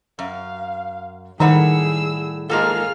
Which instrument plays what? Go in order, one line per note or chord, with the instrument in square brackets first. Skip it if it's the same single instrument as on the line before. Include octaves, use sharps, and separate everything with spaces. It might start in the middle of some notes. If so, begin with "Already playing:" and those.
[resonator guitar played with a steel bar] F#2 [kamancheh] F5
[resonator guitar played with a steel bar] A2 G3 F#5 [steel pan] D#3 [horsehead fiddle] G#4 [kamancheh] E6
[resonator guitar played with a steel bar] G#2 A#3 A4 [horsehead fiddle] F4 G#4 [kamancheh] F6